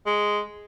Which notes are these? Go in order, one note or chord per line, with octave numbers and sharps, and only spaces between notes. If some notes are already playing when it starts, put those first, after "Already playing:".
G#3